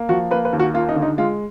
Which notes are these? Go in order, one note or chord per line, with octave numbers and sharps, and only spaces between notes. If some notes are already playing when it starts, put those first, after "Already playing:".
Already playing: A#3
F3 F#4
A#3 B4
B4
D#2
F#4
A#3 F4
D#4
D3
D#4
G#3 F4